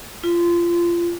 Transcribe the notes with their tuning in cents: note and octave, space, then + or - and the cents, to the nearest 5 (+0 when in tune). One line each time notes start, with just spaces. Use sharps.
F4 -25